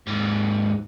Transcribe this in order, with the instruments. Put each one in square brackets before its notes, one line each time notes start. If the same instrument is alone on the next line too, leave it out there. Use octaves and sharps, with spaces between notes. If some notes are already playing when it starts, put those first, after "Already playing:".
[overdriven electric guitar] D#2 G#2